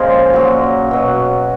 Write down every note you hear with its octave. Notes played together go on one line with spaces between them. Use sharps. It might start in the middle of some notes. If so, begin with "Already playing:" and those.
Already playing: A#2 C#3 F3 G#3 G#4 A#4
A#2 F#3
B2 F#3